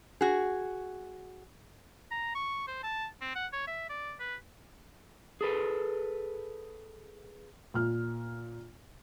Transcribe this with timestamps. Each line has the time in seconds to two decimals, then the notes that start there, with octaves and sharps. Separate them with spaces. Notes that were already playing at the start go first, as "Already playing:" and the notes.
0.21 F#4 G#4
2.11 A#5
2.35 C#6
2.67 C5
2.83 A5
3.21 C4
3.35 F#5
3.53 C#5
3.67 E5
3.89 D5
4.20 B4
5.41 G#4 A4 B4
7.74 A#2 F6